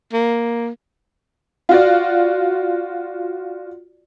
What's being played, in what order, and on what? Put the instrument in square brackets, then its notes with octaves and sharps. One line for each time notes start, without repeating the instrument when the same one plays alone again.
[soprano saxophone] A#3
[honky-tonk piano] F4 F#4 D5